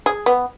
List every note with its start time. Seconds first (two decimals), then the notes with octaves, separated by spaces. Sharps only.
0.06 G#4
0.26 B3